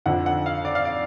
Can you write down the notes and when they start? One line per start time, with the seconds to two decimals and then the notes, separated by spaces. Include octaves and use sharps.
0.06 F2 D3 F3 F#5
0.26 F#5
0.46 F5
0.65 D5
0.75 F5
0.85 D5